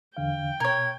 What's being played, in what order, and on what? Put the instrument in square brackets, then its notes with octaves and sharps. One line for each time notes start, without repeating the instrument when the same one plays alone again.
[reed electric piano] E2 D3 F5 [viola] G5
[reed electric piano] B2 [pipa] A#4 C#5 [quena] G#6